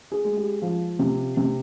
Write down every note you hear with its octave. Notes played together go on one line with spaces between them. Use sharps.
G#4
G#3
G4
F3
C3
C3